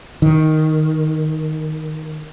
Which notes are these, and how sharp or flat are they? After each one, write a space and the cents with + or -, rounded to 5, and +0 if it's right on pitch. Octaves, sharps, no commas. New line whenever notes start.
D#3 +5